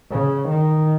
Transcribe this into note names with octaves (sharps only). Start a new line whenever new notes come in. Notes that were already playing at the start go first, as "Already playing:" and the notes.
C#3
D#3